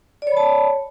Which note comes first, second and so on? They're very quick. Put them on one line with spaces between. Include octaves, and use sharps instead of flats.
D5 C#5 B5 A5